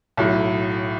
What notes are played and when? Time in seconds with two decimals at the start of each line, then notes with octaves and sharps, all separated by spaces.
0.17 B1 A2 F#3